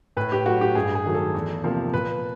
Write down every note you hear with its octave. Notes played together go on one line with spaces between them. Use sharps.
A2 B4
G4
F#3 A3 F#4
G4
G2 G#4
G#4
D#3 F#3 A3
A4
E2
C3 F3 A#3
A#2 B4